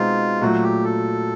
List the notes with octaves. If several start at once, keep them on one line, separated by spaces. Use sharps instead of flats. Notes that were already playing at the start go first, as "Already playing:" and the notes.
Already playing: B2 G#3 C4 D#4 F4
A#2 F#3 A3 F#4
G4
A4